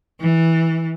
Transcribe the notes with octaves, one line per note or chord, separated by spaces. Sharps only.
E3